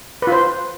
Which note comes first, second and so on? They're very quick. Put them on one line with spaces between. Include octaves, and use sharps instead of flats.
B4 F4 C5